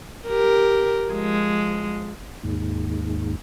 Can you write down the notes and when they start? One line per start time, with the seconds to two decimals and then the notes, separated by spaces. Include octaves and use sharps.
0.28 G4 A#4
1.10 F3 G#3
2.43 D#2 G#2